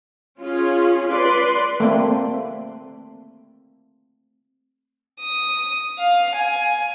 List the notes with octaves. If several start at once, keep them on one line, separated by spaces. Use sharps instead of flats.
C#4 F4 G#4
B4 D5 C6
A3 A#3 C4
D#6
F5
G#5